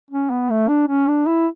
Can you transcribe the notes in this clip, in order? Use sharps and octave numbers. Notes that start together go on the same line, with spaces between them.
C#4
B3
A3
D4
C#4
D4
E4